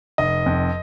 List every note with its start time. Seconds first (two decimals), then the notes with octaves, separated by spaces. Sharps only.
0.18 F1 D#5
0.46 F2